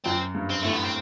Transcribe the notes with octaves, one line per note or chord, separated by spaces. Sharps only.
F#2 C4
G2
C4
A2 A3
B3
C4